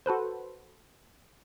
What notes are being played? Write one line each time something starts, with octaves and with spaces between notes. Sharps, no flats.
F#4 A4 B4 C5